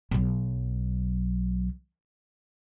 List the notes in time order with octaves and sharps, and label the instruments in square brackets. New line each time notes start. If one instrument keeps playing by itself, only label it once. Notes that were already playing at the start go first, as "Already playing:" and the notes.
[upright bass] B1 F#3